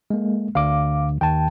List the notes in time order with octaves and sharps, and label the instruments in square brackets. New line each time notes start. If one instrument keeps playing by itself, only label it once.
[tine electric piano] G#3 A#3
[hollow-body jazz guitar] D2 [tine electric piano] F5 D6
[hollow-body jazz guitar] D#2 [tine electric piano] G5 A5